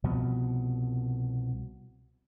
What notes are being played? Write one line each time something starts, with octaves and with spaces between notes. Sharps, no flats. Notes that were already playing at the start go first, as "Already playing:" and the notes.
C2 B2 F3 B3